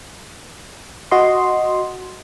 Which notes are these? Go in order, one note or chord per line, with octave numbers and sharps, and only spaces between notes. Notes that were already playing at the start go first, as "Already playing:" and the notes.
F#4 D#5 C6